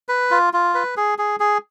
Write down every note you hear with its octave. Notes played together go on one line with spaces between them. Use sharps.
B4
F4
F4
B4
G#4
G#4
G#4